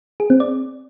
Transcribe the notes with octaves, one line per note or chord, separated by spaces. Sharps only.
G#4
C4
D5